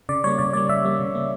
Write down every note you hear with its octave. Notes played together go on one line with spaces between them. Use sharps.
C#3 D5
G3 A#3 C#5
C#3 D5
G3 A#3 D5
C#3 E5
G3 A#3
C#3
G3 A#3